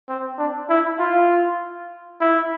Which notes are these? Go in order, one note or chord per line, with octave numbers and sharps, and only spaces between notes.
C4
D4
E4
F4
E4